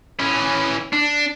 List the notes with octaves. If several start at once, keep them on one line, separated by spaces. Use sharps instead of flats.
E3 C#4
D4